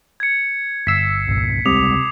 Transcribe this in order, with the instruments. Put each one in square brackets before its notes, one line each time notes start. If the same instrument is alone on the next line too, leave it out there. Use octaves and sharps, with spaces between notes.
[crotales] G#6 C#7
[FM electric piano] G1 E6 [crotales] B6 C7
[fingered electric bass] C2 G2 A#2
[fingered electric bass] C#2 G3 G#3 [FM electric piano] C3 [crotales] D6 D#6 F7